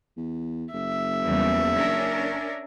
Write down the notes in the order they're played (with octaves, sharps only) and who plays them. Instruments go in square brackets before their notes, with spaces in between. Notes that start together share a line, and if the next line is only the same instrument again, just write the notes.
[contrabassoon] E2
[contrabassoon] F#1 [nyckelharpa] E5
[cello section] E2 C#3 G3
C#4 D4 A#4